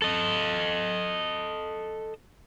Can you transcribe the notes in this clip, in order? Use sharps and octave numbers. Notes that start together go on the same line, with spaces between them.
A4 D#5